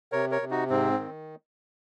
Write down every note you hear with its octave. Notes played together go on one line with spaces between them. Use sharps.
C3 A#4 C#5
A#4 C#5
C3
D#4 F#4
G#2 C4
D#3